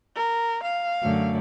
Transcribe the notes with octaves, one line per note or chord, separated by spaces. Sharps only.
A#4
F5
F#2 D3 A3